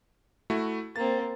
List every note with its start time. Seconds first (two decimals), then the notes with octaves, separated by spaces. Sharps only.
0.50 A3 E4 F#4
0.96 A#3 C4 A6